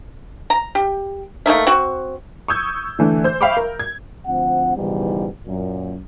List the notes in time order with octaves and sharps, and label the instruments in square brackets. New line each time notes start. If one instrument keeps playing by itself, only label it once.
[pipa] A#5
G4
A3 A#3 D#4 E5
C4 F#4
[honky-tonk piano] C#6 D#6 E6 G6 G#6
D3 E3 A3
C5 G6
E5 F5 G5 B5 C#6 D6
A#4
G#6
[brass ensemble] D2 F3 C4 F#5
C#2 G#2 B2 D#3 E3 G3
F#2 A#2